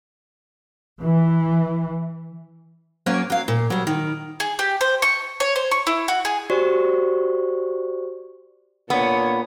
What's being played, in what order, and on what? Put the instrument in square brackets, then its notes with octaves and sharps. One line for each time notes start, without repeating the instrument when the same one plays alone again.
[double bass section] E3
[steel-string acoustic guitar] F#3 A#3 C#4 C#5 D5
F#3 F5
A#2
F#3 G3
D#3
[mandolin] G#4
G4
C5
C#6
C#5
C5
C#6
E4
F#4
G#4
[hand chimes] F#4 G4 C5 D5 C#6
[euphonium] A#2 [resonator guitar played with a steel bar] B3 [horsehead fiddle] D4 C#5